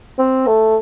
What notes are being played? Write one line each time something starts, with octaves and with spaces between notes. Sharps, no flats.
C4
A3